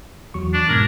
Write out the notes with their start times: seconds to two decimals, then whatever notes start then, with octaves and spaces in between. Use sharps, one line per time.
0.34 E2 F#3 C#6
0.53 D4
0.69 G#2 B2 A#4 G#6